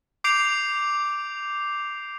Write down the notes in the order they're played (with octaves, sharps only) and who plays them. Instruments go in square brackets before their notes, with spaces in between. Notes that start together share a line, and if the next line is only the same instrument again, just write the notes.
[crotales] D6 G6 C7 D7 F7